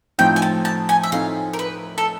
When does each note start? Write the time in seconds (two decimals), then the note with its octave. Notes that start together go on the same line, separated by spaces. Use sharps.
0.18 A2 F3 A3 C4 D#4 G5
0.36 G#5
0.42 A5
0.65 A5
0.89 G#5
1.03 E5
1.12 A2 F3 A3 C4 D#4 F5
1.53 A#4
1.59 B4
1.98 A4